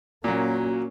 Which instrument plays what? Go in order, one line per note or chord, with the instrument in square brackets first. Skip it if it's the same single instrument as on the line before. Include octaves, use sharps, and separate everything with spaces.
[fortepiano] A#2 F#3 [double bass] A#3 C#4 [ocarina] F#4